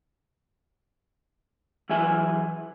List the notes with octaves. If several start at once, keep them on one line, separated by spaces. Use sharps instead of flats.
E3 F#3 G#4 E5 G#5